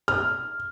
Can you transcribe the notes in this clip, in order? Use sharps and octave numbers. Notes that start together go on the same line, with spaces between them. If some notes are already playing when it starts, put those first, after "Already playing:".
F6